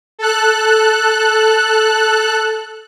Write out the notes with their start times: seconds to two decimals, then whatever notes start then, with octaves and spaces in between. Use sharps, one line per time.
0.19 A4 F#6